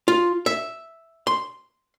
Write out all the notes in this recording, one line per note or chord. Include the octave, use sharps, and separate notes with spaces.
F4
E5
C6